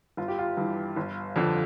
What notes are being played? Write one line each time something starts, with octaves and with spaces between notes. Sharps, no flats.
G1 F4
G4
F4
G2 E3
G1
F2 D3